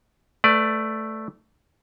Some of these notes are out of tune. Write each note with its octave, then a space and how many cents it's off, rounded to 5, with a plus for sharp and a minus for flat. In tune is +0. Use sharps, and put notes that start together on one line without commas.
A3 +0 B4 +25 D5 +0